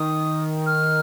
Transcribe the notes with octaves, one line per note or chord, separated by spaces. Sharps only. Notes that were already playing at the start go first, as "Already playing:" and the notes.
Already playing: D#3 D#6
F6